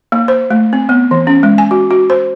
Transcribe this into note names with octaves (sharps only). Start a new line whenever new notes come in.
A#3
C5
A3
C4
B3
E3
C#4
G#3
G#5
F#4
F#4
C5